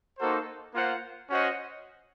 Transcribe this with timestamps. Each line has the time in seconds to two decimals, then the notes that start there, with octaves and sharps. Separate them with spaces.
0.18 A#3 D#4 F#4 A4 C5
0.74 A#3 F4 C5 F#5
1.30 C#4 F#4 C5 D#5 F#5